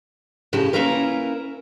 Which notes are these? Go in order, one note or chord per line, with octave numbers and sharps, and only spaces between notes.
A2 C#3 G4 A5
A#3 C#4 E4 F4 A#4 B4